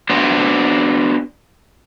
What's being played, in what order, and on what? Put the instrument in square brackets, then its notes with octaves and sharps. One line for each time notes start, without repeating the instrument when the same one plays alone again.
[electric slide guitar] B3 D4 F#4 C5